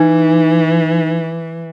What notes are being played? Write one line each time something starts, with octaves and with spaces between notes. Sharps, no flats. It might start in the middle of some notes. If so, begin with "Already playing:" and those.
Already playing: E3 D#4